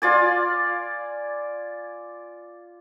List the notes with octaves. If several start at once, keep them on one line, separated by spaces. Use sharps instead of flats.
F4 D5 G#5